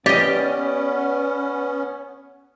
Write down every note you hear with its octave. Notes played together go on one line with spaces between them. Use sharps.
B3 C#4 G4 D5 D#5